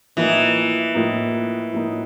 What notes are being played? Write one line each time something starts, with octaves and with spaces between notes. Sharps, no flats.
A2 E3 F3 A#3 D#4
A2 F3 A#3 D#4
A2 F3 A#3 D#4